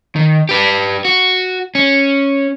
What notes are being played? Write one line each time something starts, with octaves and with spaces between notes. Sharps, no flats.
D#3
G4 B4
F#4
C#4